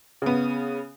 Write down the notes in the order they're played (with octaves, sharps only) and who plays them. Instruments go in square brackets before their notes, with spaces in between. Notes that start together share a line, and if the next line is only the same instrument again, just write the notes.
[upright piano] C#3 B3